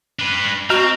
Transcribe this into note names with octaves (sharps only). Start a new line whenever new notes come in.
D4 B4
C4 F#4 D#5 A#5 F6